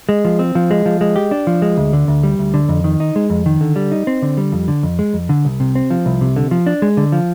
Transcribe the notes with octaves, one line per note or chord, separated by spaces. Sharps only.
G#3
F3
C4
F3
G#3
F3
G#3
G4
D4
F3
G#3
D2
D3
D2
G3
D2
D3
F2
D#3
D#4
G#3
F2
D#3
D3
G3
D#4
C4
D3
G3
F2
D3
F2
G#3
F2
D3
C2
C3
C4
F3
C2
C3
D3
F3
D4
G#3
D3
F3